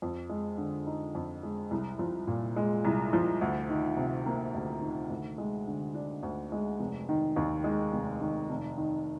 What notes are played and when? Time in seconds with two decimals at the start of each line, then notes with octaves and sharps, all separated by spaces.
0.02 F2
0.29 G#3
0.58 D3
0.87 D#4
1.15 F2
1.43 G#3
1.71 C2
1.99 F3
2.27 A#2
2.56 G#3
2.85 C2
3.13 F3
3.41 D2
3.69 D#3
3.97 C3
4.26 A#3
4.54 D2
4.81 D#3
5.10 D2
5.38 G#3
5.67 D3
5.95 D4
6.23 D2
6.52 G#3
6.80 F1
7.09 D#3
7.36 D#2
7.64 G#3
7.93 F1
8.21 D#3
8.49 F1
8.77 D#3